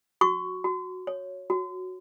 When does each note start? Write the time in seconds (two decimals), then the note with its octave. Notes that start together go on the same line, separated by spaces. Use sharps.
0.21 F#4 C#6
0.64 F#4
1.07 C#5
1.50 F#4